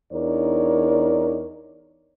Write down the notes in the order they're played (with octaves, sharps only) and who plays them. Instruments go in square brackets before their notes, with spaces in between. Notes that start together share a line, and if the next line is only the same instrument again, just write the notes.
[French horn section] E2 D4 D#4 A#4 C#5 D5